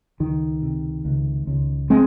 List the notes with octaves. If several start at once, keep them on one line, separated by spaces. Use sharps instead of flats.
C#2 D#3
C3
C#2
C#2
G#3 C4